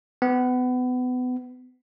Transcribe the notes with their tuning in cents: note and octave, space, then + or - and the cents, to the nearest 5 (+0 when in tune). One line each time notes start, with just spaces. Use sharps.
B3 +25